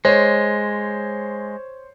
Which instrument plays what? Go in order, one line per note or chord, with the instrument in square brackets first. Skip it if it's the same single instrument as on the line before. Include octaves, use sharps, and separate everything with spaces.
[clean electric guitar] G#3 [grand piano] C5 C#5